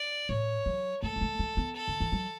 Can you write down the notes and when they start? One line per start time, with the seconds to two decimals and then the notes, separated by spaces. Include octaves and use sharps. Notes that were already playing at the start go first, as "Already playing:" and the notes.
Already playing: D5
0.29 A2 C#5
0.66 F#3
1.03 A3 A4
1.16 G#3
1.21 A3
1.39 A3
1.57 B3
1.76 A4
1.88 D3
2.00 E3
2.12 F#3